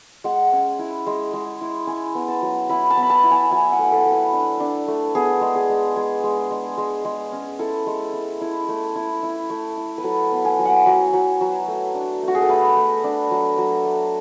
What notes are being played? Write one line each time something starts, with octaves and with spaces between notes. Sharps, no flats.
G#3 F#5
C#4
E4
G#3
G#3
E4
E4 G#5
B3
A5
F#3
E4 B5
A5
B3
B5
A5
E4
G#5
F#3 G#5
F#5
A3
A4
A3
B4
D4
D4
A3
B3 G#4
G#3
G#4
G#3
G#3 G#4
G#3
G#3
G#3
G#3
C#4
E4 A4
G#3
E4
E4
A3
E4
E4
A3
E4
B4
F#3 A4
B3
G#5
F#3
F#5
F#3
F#3
F#3
A3
D4
A3 F#4
G#4
A4
A3 B4
A3
D4
F#3
F#3
A3